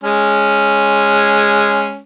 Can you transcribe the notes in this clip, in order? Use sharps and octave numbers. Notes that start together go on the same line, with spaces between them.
G#3 C#4